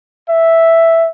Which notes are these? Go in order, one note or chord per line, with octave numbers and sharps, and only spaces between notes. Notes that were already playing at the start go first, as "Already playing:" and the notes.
E5